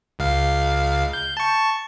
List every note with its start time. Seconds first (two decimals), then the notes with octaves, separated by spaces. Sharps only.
0.19 C#2 F5
1.13 G6
1.37 A5 C#6